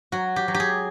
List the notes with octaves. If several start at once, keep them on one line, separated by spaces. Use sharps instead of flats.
F#3 F#4
G4
F#3
G4
G#4